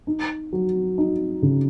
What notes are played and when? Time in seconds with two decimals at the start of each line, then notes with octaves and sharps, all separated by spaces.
0.07 D#4
0.53 F#3
0.98 D#4
1.42 C#3